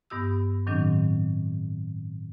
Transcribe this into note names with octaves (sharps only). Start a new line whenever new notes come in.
G2 B3 G4 D#6 E6
A2 D#3 F#3 C4 D4